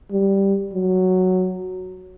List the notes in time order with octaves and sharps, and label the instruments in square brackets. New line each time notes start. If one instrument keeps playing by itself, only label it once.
[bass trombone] G3
F#3